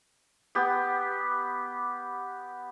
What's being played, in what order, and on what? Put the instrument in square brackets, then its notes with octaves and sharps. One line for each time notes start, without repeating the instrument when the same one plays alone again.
[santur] B3 G4